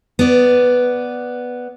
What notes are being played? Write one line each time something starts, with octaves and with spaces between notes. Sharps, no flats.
B3 D5